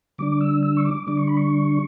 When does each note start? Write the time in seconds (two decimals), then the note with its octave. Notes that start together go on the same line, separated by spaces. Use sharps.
0.18 D3 G3 D4 D6
0.41 E6
0.63 E6
0.77 C#6
0.86 D6
1.07 D3 G3 D4 D6
1.17 C#6
1.28 B5
1.37 C#6